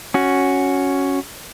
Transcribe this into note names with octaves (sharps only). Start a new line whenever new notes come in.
C#4 F#4